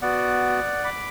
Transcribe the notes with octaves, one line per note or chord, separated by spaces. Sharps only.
B3 F#4 D5 F#5
B5 D6